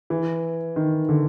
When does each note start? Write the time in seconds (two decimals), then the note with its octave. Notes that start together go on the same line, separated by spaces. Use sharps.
0.10 E3
0.76 D#3
1.09 D3